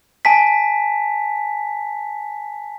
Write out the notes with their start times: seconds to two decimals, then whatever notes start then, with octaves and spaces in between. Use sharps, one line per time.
0.25 G#5 A5 B6